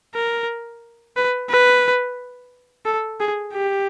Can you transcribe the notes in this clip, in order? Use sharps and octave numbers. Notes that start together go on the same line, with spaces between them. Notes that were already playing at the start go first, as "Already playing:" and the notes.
A#4
B4
B4
A4
G#4
G4